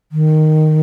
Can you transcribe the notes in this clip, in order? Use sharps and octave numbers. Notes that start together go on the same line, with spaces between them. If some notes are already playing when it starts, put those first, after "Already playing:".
D#3